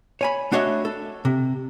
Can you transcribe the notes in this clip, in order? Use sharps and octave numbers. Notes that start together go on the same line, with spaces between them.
C#5 G#5 B5
A3 D4 F#4 C#5 D#5 E5
A4
C3